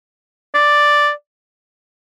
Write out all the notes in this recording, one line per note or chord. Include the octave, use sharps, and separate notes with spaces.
D5